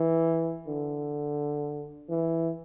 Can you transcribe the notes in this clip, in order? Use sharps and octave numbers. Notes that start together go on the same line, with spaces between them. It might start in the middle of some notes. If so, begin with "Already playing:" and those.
Already playing: E3
D3
E3